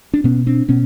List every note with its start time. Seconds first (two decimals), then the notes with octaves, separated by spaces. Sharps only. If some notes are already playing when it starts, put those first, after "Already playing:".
0.14 D4
0.24 B2 B3 C#4
0.47 C4 D4
0.69 B2 B3 C#4